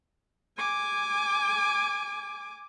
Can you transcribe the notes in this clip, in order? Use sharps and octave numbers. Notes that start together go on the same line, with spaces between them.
G#5 D6